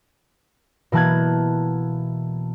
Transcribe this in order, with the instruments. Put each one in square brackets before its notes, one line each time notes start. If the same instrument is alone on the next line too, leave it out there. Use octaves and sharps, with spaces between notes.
[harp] B2 E3 A#3 A5 F#6 G#6